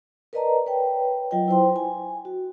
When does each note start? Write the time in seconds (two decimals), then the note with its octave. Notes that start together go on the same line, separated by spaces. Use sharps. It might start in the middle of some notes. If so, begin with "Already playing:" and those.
0.33 A#4 B4 D5 D#5 A5 A#5
0.66 B4 C#5 G5
1.31 F#3 F4 D#5 G5
1.48 E4 C5 G5 C6
1.76 G#5
2.25 F#4